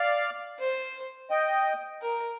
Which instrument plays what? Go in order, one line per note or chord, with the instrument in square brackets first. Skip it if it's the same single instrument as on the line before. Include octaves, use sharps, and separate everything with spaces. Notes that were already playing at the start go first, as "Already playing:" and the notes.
Already playing: [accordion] D5 F5
[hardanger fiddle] C5
[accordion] D#5 G5
[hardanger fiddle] A#4